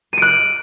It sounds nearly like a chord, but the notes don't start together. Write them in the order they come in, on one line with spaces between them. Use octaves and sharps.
D#7 D7 F#6